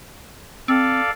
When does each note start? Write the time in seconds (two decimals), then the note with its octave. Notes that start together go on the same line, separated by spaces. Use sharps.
0.68 C4 A4 D5 F5